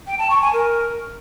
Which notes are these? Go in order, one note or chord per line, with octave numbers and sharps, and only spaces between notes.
G5
A5
C#6
G#5
A#4